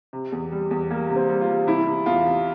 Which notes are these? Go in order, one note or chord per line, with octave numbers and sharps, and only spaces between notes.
C3
E2
G3
E2
G3 A#3
C3
C4
G3
F4
G3
C3 E4
C3
E2 F4
C3